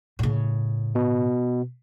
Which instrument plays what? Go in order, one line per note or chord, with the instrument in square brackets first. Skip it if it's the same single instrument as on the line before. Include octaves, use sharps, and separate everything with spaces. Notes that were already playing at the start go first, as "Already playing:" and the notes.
[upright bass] A2 C#3
[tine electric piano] B2